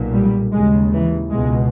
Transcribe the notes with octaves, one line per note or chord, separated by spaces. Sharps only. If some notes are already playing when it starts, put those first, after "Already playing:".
Already playing: B1 A#2
G3
D#2 C#3 G#3
E3
C#2 B2 G#3